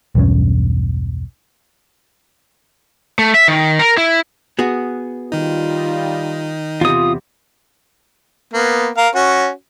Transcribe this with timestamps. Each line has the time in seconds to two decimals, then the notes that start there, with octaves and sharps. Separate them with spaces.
0.15 B1 E2 G2 C#4
3.19 A3
3.34 E5
3.48 D#3
3.79 A#4
3.97 E4
4.59 B3 F#4 G#4
5.32 D#3 G3 D#4 F4
6.81 E2 C3 F4 D#6
8.54 A#3 B3
8.97 A#4 F5
9.15 C#4 F#4